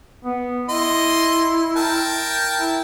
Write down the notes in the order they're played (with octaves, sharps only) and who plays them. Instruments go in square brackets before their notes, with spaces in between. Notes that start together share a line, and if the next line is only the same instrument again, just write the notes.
[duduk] B3
[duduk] E4 [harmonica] D#5 C6
[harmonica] A#4 G5 A5
[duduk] E4